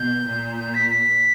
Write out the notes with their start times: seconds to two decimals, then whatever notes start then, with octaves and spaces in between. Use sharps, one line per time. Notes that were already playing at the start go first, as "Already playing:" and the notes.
Already playing: B2 G6
0.26 A#2
0.57 G6
0.74 B6
0.90 B6